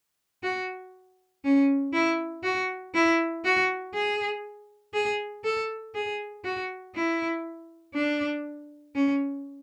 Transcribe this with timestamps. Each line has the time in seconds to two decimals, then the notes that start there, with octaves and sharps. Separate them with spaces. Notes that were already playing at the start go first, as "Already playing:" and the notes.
0.43 F#4
1.44 C#4
1.93 E4
2.43 F#4
2.94 E4
3.44 F#4
3.94 G#4
4.94 G#4
5.44 A4
5.95 G#4
6.44 F#4
6.95 E4
7.94 D4
8.95 C#4